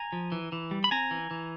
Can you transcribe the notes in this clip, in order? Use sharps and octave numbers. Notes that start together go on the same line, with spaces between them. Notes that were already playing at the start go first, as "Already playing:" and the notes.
Already playing: G#5 A#5
F3
E3
E3
G3
B5
C4 G#5 A#5
E3
E3